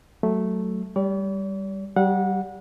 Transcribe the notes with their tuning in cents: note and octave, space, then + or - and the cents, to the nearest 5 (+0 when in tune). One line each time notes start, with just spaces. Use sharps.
F#3 +15 A3 +0
G3 +0 D5 -45
G3 -30 G4 +20 F#5 -25